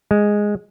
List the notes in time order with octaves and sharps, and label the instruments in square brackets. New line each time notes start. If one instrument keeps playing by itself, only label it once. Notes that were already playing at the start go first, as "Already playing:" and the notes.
[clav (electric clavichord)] G#3